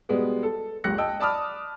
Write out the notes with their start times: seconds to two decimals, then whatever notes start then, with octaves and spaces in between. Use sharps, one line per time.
0.09 B2 G3 G#3 B3
0.43 A4
0.84 F#1 C#2 G4 F#6 A#6 C#7
0.98 D#5 G5 A5 E6
1.20 D5 A5 B5 D6 D#6 F6